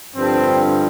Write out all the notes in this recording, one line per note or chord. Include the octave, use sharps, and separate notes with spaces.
G2 D3 F3 C4